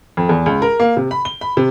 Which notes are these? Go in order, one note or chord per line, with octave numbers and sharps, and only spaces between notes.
F2
E2
C#2
A#4
A#3
C3
B5
G7
B5
C3